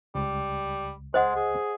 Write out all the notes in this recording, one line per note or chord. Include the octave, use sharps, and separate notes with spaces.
C#2 G3
G#3 C5 D#5 F#5
G#4